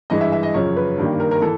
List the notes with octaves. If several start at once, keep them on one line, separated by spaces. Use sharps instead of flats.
G2 E3 G#3 D#5
E5
E5
D#5
F#2 C#3 F3 C#5
B4
G2 D#3 G3 A#3
A#4
A#4
E3 A4